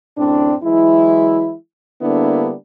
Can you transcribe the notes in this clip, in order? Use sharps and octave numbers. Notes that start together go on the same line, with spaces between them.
F#2 A2 C4 D4
E3 F#3 G#3 E4
D3 G3 A#3 B3 D4 E4